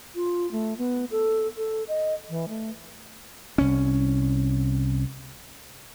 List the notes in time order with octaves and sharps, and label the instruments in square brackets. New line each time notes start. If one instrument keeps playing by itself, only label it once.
[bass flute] F4
A3
B3
A4
A4
D#5
E3
A3
[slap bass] C2 C#4